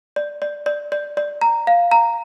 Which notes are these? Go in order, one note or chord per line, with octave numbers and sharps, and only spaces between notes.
D5
D5
D5
D5
D5
A#5
F5
A#5